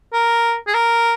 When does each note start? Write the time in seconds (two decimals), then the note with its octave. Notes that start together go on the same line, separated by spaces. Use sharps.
0.13 A#4
0.67 G#4
0.73 A#4